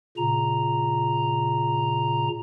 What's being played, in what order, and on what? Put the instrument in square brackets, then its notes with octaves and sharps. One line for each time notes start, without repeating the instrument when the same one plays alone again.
[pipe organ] A#2 C#3 A#5